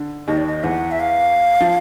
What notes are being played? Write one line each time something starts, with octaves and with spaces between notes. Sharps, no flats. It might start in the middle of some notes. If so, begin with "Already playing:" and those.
Already playing: D3
D#2 D#3 D#5
D5
D#5
E2 E3 F#5
E5
F5
F3